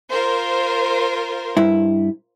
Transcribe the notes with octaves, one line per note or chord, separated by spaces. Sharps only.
F4 A#4 C5
G2 E4